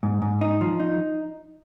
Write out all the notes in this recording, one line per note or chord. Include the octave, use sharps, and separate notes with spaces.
G#2
G#2
D#4
F3
D#4